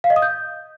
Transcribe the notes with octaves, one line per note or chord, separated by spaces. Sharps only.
F5
D#5
D#6
G6